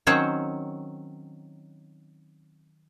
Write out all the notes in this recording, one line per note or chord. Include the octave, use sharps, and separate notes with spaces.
D#3 F#3 C4 C#4 C5 C#5